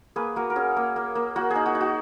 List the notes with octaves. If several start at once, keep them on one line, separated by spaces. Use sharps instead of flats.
A#3 G#4 B4
A#3 F#4 A#4
A#4
C#4 G#4
A#3
A#3
A#3
A#3 F#4
D#4 G#4
F#4
D#4
F#4